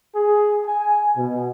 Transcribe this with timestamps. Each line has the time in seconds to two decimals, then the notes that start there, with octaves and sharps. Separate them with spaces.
0.15 G#4
0.66 G#5
1.17 B2